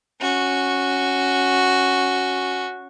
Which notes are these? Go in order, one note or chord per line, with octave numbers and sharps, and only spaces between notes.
C#4 F#4